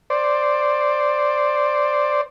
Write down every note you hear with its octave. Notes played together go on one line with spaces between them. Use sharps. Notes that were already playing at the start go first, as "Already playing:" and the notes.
C5 D5